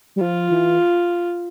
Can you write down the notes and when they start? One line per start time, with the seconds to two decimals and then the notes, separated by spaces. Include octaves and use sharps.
0.16 G3
0.21 F3 F4
0.51 E3